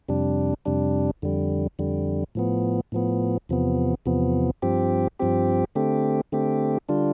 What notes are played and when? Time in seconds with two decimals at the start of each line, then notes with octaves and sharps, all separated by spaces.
0.09 F2 C3 G3 D4
0.65 F2 C3 G3 D4
1.22 F2 D3 G3
1.79 F2 D3 G3
2.35 A2 F3 B3
2.92 A2 F3 B3
3.49 E2 C3 F3 B3
4.06 E2 C3 F3 B3
4.62 G2 F3 C4 G4
5.19 G2 F3 C4 G4
5.75 D3 A3 C4 G4
6.32 D3 A3 C4 G4
6.89 D3 G3 D4 F4